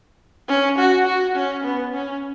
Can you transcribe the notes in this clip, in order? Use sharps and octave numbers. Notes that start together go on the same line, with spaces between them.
C#4
F#4
F#4
C#4
B3
C#4